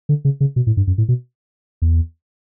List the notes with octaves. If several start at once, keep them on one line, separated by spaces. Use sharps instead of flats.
D3
C#3
C#3
B2
A2
G2
F#2
A2
B2
E2